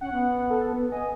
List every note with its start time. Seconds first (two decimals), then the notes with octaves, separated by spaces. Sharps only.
0.01 C#4 F#5
0.12 B3
0.50 A4
0.73 B3
0.92 D#5 G#5